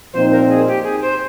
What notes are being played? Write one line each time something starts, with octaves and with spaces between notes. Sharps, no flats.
A#2 F3 C4 D#4 C5
A#4
G#4
G4
G#4
C5